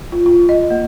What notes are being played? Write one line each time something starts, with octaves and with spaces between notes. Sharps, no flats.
F4
F4
D#5
A#3